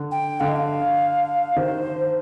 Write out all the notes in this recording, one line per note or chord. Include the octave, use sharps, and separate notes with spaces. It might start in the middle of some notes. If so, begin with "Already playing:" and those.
Already playing: D3
G5
D3 F5
D#5
F5
D#3 C5